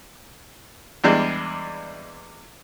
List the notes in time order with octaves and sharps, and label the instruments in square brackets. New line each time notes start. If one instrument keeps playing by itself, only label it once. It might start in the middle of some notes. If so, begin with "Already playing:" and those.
[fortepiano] E2 E3 G3 G#3 D4